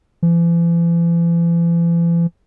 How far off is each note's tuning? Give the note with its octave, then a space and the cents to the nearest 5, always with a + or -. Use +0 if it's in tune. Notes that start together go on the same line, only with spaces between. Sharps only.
E3 +45